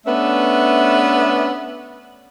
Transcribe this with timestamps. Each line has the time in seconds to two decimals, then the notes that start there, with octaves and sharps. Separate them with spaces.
0.06 A3 B3 C#4 D4 B4 E5